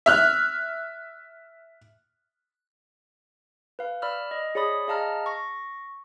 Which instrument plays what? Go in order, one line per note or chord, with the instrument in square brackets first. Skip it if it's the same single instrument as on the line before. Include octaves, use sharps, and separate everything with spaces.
[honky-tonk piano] E5 F6 F#6
[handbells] B4 F5
D5 B5 E6 F6
D#5
G#4 C#5 D5 B5 D#6
G#4 D#5 F5 A5 A#5 F6
C#6 A#6